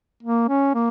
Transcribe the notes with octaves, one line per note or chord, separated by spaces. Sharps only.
A#3
C#4
A#3